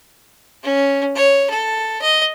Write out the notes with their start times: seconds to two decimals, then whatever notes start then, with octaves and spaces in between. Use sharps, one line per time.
0.63 C#4
1.15 C#5
1.50 A4
2.02 D#5